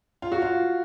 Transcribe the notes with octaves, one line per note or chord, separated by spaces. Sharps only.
F4
F#4
F4